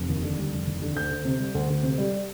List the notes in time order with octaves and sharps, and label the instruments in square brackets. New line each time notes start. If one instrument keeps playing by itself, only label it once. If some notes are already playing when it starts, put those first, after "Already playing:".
Already playing: [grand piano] F1
D#2
D3
G3
F1
D#2
D3
D2 G6
D2
C3
G3
D2
D2
C3
G3